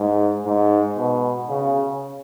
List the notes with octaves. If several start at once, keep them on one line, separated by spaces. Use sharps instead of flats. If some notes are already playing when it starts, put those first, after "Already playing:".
Already playing: G#2
G#2
B2
C#3